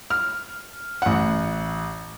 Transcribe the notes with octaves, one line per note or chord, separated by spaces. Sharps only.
F6
A1 F#5